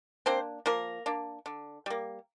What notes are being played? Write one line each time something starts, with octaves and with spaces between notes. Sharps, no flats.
A#3 C4 D4 C5
F3 A#3 A#4
A#3 D4
D3
G3 A#3